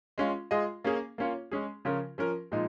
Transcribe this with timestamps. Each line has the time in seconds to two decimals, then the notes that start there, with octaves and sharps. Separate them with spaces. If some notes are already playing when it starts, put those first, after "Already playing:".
0.18 G#3 C#4 F4
0.51 G#3 F4 G#4 D#5
0.84 A#3 C#4 G#4
1.18 A#3 C#4 F4 C#5
1.52 G#3 C#4 G#4
1.85 C#3 F3 C#4 F4 A#4
2.18 F3 C#4 A#4
2.52 A#2 F3 G#3 D#4